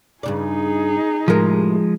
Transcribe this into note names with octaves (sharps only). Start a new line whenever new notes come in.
G2 C#3 D#4 G#4 D5
A2 C3 F3 G#3 A#4